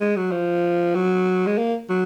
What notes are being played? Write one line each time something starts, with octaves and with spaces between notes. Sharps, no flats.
G#3
F#3
F3
F#3
G#3
A#3
F#3